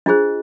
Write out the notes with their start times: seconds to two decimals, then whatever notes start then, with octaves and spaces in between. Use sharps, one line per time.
0.06 D4 F4 G#4 C5 D#5